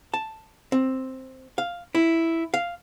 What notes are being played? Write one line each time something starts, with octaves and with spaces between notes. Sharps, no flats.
A5
C4
F5
E4
F5